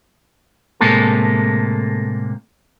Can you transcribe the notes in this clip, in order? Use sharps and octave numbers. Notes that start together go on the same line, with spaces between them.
A2 C3 G#3 A#3 A4